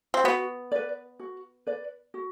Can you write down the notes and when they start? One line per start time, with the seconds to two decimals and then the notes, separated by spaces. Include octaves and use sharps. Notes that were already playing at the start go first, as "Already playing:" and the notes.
0.14 C4
0.24 B3 F#4
0.72 B4 D5
1.19 F#4
1.67 B4 D5
2.14 F#4